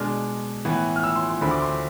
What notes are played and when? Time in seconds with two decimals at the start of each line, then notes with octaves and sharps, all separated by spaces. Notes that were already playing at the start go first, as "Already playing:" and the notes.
Already playing: B2 G#3 D4 F6
0.65 A2 E3 B3
0.96 F6
1.04 E6
1.16 C6
1.29 C6
1.41 D2 D3 A3 C4 B5
1.51 D6
1.61 C6